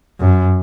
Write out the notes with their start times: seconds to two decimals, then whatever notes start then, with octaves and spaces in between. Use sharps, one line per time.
0.21 F#2